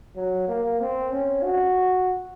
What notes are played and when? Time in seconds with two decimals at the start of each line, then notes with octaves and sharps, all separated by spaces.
0.16 F#3
0.48 A#3
0.80 C4
1.11 C#4
1.44 F#4